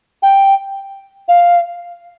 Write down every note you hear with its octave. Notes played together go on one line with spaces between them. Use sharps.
G5
F5